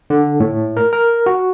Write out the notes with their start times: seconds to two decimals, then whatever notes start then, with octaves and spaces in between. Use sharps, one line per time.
0.10 D3
0.40 A2
0.77 A#4
0.93 A#4
1.26 F#4